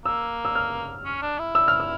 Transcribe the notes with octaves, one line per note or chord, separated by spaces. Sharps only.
A#3 E6
E6
F6
C#4
D4
E4
E6
F6
E6